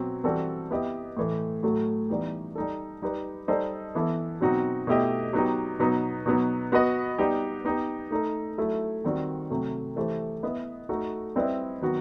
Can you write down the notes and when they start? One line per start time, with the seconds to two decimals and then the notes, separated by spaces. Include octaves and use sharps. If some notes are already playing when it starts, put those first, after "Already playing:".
Already playing: B2 F#3 C4
0.24 E3 G3 C4 F#4 A4
0.71 B3 E4 G4 D#5
1.17 A2 E3 A3
1.63 A2 F#3 A3
2.09 E3 G3 B3 D#4 G4
2.55 G3 D#4 A4
3.02 G3 D#4 G4 B4
3.48 G3 D#4 A4 C5 D#5
3.95 E3 B3 E4 A4
4.41 B2 F#3 C4 D#4 F#4
4.87 B2 A3 E4 G4 D#5
5.33 F#3 B3 D#4 G4
5.79 B2 F#3 B3 D#4
6.26 B2 F#3 B3 D#4
6.72 B3 F#4 B4 D#5
7.18 G3 B3 D#4 G4
7.65 B3 D#4 G4
8.11 A3 D#4 A4
8.58 F#3 A3 E4
9.04 D#3 G3 C4 F#4
9.50 C3 F#3 A3
9.96 E3 A3 E4 G4 C5
10.43 B3 E4 B4 D#5
10.89 A3 D#4 F#4 A4
11.36 G3 C4 E4 B4 D#5
11.82 D#3 F#3 B3 F#4